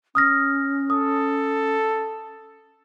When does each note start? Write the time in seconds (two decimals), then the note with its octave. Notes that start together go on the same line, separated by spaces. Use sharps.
0.15 C#4 D#6 F6 A#6
0.90 A4 D#6